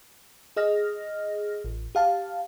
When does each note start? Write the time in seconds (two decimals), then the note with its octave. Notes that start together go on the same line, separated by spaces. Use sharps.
0.56 G#4 D#5 F6 A#6
1.64 A1
1.95 G4 F5 A5